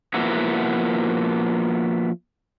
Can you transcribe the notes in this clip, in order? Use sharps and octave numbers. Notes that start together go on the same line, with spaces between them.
F3 A#3 B3 E4 F#4